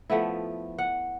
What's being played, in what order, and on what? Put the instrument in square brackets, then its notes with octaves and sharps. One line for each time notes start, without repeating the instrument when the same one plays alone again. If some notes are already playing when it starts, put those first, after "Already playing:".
[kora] F3 A3 B3 E4
F#5